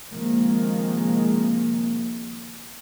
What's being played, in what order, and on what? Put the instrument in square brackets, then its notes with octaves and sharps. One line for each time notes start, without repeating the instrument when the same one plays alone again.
[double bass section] C3 D#3 F3 G#3 A#3